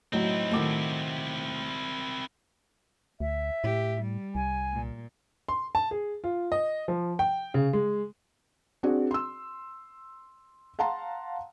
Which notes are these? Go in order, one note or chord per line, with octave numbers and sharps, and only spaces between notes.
A2 F#3 C4 D#4 E4
A2 D#3 F#3 A4 D6
D2 E5
A2 G4
G3
C2 G#5
A#2
C6
A5
G#4
F4
D#5
F3
G5
C#3
G#3
C4 D4 F#4 G#4 D5
C6 E6
F5 F#5 A5 A#5 C6